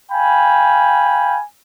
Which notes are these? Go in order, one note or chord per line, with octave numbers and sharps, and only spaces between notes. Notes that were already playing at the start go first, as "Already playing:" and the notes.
F5 G5 G#5 B5